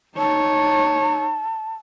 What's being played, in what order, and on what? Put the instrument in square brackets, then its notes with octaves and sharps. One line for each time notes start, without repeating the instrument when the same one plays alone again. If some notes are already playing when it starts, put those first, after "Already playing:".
[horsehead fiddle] D#4 C#5 [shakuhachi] A5